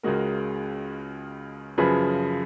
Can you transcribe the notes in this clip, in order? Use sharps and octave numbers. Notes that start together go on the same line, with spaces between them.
C#2 C#3 G#3 F#4 A#4
F#2 C#3 F3 G#4 B4